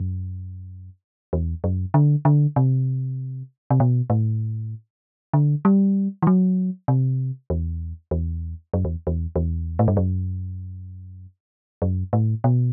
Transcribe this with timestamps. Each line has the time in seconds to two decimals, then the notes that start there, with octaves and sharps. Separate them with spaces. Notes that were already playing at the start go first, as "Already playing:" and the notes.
Already playing: F#2
1.33 E2
1.64 F#2
1.94 D3
2.25 D3
2.56 C3
3.71 C3
3.80 B2
4.10 A2
5.33 D3
5.65 G3
6.22 E3
6.27 F#3
6.88 C3
7.50 E2
8.11 E2
8.74 F#2
8.85 E2
9.07 E2
9.36 E2
9.79 A2
9.88 G2
9.97 F#2
11.82 F#2
12.13 A2
12.44 B2